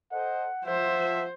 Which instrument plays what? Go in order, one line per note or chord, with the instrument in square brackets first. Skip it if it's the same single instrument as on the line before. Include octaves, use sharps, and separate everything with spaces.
[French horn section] A4 C5 D#5 [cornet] F#5
[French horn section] F3 F4 [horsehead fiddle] C5 [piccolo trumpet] E5 [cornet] F#5